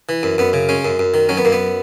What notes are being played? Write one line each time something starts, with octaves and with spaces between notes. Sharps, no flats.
E3
F#2
F#2 B3
C#3
G#3 C#4
F#2
F#2
D#3
F#3 C#4
B3
F#2 A#3
B3